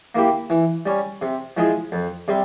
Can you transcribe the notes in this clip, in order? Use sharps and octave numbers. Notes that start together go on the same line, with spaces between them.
A#3 E4 G4
E3
G3 C#4
C3
F3 G#3 E4 G#4
F2
C3 G3 C4